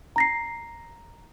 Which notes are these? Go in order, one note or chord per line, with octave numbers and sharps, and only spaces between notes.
A#5 A#6 C7